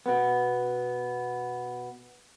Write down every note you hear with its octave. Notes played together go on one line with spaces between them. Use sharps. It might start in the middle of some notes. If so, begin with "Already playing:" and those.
B2 B3